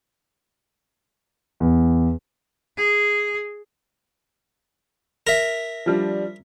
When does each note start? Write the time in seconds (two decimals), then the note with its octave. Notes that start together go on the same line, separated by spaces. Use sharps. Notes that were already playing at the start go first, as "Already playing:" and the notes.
1.60 E2
2.77 G#4
5.27 A#4 E5
5.86 F3 G3 D4